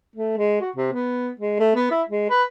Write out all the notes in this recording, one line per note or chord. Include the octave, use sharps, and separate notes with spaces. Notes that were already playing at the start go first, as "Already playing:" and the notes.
A3
G#3
F#4
C3
B3
G#3
A3
B3
E4
G#3
B4